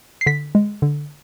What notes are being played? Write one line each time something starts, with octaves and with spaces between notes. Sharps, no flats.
C7
D3 B6
G#3
D3